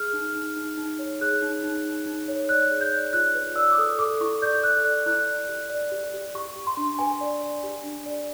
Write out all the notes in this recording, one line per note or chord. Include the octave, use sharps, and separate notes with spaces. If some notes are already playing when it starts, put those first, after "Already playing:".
Already playing: G#4 F6
D#4
D#4
D#4
D#4
C#5
G#4 F#6
D#4
D#4
D#4
D#4
C#5
D5 F#6
G#4
G6
D5
F4 F#6
B4
D5 E6
D6
A4 D#6
A4 D6
E4 C#6
D5 G6
A4 F#6
D5 F#6
E4 F#6
D5
G4
D5
G4
G4
G4 C#6
G4
C6
D4
B4 G#5
D5
D5
G4
D4
D5